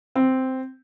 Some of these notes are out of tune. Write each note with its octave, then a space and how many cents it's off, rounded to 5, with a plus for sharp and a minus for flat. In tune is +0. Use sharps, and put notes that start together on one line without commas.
C4 -5